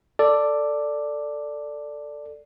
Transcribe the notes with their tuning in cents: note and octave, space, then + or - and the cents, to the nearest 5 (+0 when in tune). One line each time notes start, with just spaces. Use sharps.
A4 +10 D5 +0